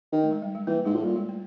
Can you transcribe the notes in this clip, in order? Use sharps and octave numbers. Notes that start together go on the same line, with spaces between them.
D#3
A3
G#3
G3
G#3
E3 A#3
G#2 G#3
A2
A#2 G3
G#3
A3